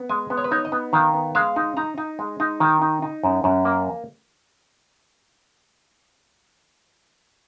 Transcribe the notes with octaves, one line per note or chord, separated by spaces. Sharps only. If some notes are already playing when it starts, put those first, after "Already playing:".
Already playing: B3
G#3 G#5
B3
C#5
B4
D#4 C#5
D#5
B3
D#3 F5
B3
G#3 F5
D#4
D#4 A#5
D#4
G#3
D#4
D#3 G#5
D#4
D#4
F#2
F#2
A#3